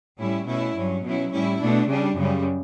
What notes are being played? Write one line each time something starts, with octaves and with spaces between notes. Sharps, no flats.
A2 G3 C#4 E4
B2 A3 C#4 E4
G2 F#3 C#4
B2 F#3 C#4 E4
A2 G3 C#4 E4
B2 A3 D4
C#3 G3 D4
F#2 C#3 G3